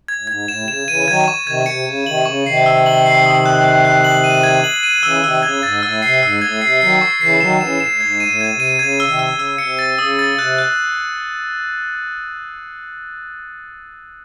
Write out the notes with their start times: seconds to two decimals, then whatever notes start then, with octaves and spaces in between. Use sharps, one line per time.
0.08 G#6
0.19 A2
0.27 G#2 G#6
0.48 A2 E7
0.61 C3
0.68 C#3 E7
0.87 C#3 E3 D#7
1.07 D#3 F#3 G#6
1.28 C#6
1.47 C3 D#3 G#6
1.66 C3 C#7
1.86 C#3 C#7
2.06 C3 D#3 F#7
2.25 C#3 C#6
2.46 C3 D#3 C7
2.66 E6
2.86 F#7
3.06 C7
3.26 D#6
3.46 F#6
3.64 F#6
3.85 F#6
4.04 F#7
4.24 D#7
4.43 G#6
4.64 F#7
4.83 D#7
5.03 C#3 E3 E6
5.23 C3 D#3 E6
5.43 C#3 G#6
5.63 G#2 A6
5.83 A2 E6
6.02 C3 C7
6.22 G#2 E6
6.41 A2 G#6
6.61 C3 C7
6.81 D#3 F#3 C7
7.01 C#6
7.21 C#3 E3 C7
7.41 D#3 F#3 E7
7.61 C#3 E3 E7
7.80 A2 E7
7.92 A2
8.00 G#2 G#6
8.20 D#7
8.27 A2
8.41 G#6
8.53 C3
8.60 D#7
8.79 C#3 G#6
9.00 E6
9.06 C3 D#3
9.19 E6
9.32 C#3
9.39 E6
9.58 C3 C#7
9.79 A6
9.98 C#3 D#6
10.19 A6
10.38 C3 F#6
10.58 F#6